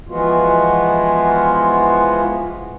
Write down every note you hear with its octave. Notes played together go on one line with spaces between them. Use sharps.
E3 F3 G#3 B3 F4 F#4